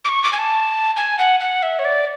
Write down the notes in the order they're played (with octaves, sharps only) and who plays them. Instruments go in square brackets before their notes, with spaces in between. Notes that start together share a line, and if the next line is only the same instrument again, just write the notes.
[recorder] D6
C#6
D6
G#5
A5
G#5
F#5
F#5
E5
C#5
D5